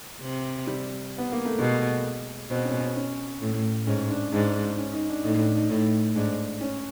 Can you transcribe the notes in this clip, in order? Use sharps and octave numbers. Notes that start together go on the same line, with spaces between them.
C3
G3
B3
A#3
A3
B2 G#3
B2 C4
C#4
C#4
C#4
A2
G#2 C#4
D4
G#2 D4
C#4
D#4
D4
A2 D#4
D4
D#4
A2 D#4
G#2 D4
C#4